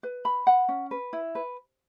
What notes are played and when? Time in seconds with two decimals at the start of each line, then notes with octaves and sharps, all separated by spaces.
0.03 B4
0.25 B5
0.47 F#5
0.69 C#4
0.91 B4
1.13 E4
1.35 B4